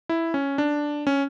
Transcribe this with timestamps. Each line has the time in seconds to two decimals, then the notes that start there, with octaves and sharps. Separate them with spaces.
0.09 E4
0.34 C#4
0.58 D4
1.07 C#4